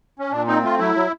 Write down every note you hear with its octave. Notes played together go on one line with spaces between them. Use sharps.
C#4
A#2 D4
C4 D#4
A3 F4
F#3 E4
F#3